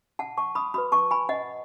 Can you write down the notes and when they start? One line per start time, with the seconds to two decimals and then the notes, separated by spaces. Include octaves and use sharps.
0.19 F#5 A5
0.38 A5 C#6
0.55 B5 D#6
0.74 F#4 B4 B5 D#6
0.92 A5 C#6
1.11 G#5 B5
1.29 D#5 F#5